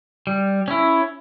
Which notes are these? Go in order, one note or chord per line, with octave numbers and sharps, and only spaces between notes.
G3
C#4 E4